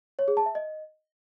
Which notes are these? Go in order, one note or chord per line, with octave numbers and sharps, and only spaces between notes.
C#5
G#4
A5
E5
D#5